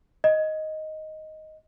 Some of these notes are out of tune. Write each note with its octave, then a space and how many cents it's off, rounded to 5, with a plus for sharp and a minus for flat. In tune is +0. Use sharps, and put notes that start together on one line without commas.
D#5 +5